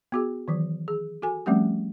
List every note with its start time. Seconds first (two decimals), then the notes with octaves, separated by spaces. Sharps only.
0.12 B3 F#4 G#4
0.48 D#3 E3 F#3
0.88 G#4
1.22 F#4 A4 G#5
1.46 F3 G3 A3 C4 C#4 G4